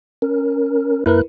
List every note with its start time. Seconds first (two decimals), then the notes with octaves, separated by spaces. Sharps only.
0.22 C#4 A#4
1.06 F#2 A#3 E4 A#4 B4 F#6